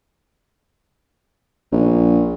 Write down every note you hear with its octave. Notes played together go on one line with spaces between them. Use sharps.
A#1